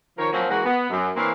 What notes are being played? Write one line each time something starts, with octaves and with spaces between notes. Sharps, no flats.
D#3 F3 A#4 C#5
F3 F#3 A#3 C4 C#4
E3 G#3 A#3 F#4
B3
F#2
E3 A#3 C4 D4 C#5 F5